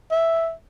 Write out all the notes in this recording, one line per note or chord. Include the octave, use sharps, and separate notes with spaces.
E5